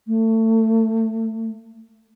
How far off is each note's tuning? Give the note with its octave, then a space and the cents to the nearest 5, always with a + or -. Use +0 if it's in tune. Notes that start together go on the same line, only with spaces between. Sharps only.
A3 +25